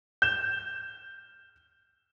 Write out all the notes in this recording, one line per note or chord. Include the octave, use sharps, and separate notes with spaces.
G6 E7